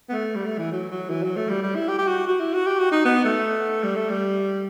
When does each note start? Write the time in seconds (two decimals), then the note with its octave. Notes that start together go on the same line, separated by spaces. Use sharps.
0.09 B3
0.12 A3
0.35 G3
0.46 A3
0.58 E3
0.71 F#3
0.91 F#3
1.10 E3
1.23 F#3
1.36 A3
1.49 G3
1.63 G3
1.75 E4
1.88 G4
1.99 G4
2.08 F#4
2.27 F#4
2.40 E4
2.54 F#4
2.67 G4
2.79 F#4
2.92 D#4
3.05 B3
3.25 A3
3.83 G3
3.96 A3
4.09 G3